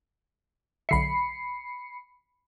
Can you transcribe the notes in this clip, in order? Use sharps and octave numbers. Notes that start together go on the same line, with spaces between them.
B1 D3 E5 B5 C7 C#7